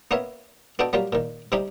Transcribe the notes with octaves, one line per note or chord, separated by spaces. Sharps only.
A#3 B3 C#4 A#4 C#5 E5
B3 D4 F#4 A4 D#5 G5
F#3 G3 A#3 F4 G4
A#2 D#3
C3 G3 C4 D#4 G4